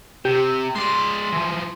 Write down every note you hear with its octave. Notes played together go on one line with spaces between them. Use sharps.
C3 G4
G#3 D5 C6
E3 F3